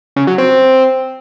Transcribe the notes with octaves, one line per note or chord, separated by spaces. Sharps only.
C#3
F#3
C4